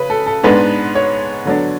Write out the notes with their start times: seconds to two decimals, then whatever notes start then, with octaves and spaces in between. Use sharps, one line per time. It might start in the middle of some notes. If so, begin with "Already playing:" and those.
Already playing: C#3 B4
0.10 A4
0.26 A4
0.43 G#2 G#3 B3 D4 B4
0.95 C#5
1.45 D3 F#3 B3 D4